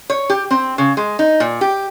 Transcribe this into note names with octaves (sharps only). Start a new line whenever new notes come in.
C#5
G4
C4
C#3
G#3
D#4
A#2
G4